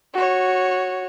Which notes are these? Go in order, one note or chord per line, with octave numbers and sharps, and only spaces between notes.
F#4 C#5